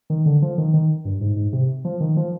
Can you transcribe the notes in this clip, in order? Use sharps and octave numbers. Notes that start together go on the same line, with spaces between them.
D#3
D3
F3
D#3
D#3
G2
G#2
G#2
C3
F3
D#3
F3